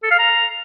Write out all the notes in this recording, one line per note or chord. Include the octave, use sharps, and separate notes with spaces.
A4
F5
A#5